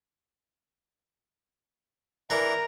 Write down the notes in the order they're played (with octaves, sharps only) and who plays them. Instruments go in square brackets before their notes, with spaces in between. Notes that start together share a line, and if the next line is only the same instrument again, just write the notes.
[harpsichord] E3 D4 [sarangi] A#4 [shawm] A#5